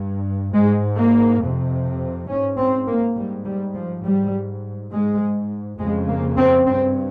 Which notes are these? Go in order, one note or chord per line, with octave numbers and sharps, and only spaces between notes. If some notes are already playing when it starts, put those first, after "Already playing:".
Already playing: G2
G#2 G#3
A#3
F2 C3
G#2 C#4
C4
A#3
G#2 G3
G3
F3
G#2 G3
G#2 G#3
F2 C#3 G#3
A#3
C4
G2 C4